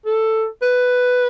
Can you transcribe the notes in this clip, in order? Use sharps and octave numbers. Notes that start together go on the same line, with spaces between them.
A4
B4